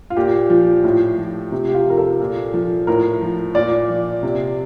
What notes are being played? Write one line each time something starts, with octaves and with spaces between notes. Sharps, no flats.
F4
A#2 G4
F3
A2
F3
C3
G4
F4
F3 A#4
A4
A#2
F3
A2 A#4
F3
A#2 D5
F3
C3